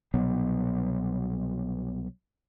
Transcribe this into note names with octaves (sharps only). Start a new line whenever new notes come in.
C2 B2 F#3 B3